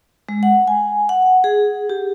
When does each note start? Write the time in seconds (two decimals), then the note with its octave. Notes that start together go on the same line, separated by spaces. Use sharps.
0.29 G#3
0.43 F#5
0.67 G#5
1.09 F#5
1.44 G#4
1.90 G4